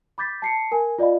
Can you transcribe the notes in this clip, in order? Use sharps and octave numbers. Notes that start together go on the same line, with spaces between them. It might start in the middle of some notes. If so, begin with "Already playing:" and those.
B5 D6 G6 A6 B6
A5 C7 C#7
A#4 G#5
F4 D5 D#5 F5 B5